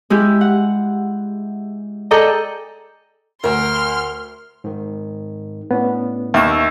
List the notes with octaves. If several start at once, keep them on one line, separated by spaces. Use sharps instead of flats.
G#3 E4 G4
F#5
G#4 A4 D5 D#5 G5 A#5
D2 A#4 E5 C6 F6
G#2 D#3
A2 B3 C#4 D4
D#2 E5 C#6 E6